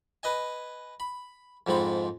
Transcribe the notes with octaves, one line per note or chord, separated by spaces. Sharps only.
B4 D#5 G#5
B5
F2 G#2 G#3 C4 B5